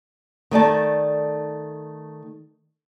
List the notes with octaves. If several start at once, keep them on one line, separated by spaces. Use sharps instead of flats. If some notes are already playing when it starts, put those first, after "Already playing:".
D#3 A3 D5 A5